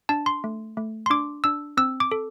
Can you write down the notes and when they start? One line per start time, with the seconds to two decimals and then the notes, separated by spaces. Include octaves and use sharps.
0.09 D4 A5
0.26 C6
0.44 A3
0.77 A3
1.06 C6
1.10 D4 D6
1.44 D4 E6
1.77 C4 E6
2.00 D6
2.12 A4